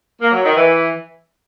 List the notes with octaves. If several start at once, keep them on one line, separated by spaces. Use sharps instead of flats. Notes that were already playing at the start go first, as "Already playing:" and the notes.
A#3
F#3
D#3
E3